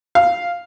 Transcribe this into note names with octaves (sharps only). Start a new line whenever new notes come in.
F5